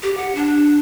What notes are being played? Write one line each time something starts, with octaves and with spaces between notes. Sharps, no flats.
G4
F#5
D4